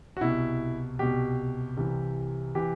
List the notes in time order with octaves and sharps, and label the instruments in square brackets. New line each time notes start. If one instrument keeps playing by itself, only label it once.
[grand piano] F#4
C2 B2 E4
C2 B2 G4
C2 C3 E3
C3 E3 G4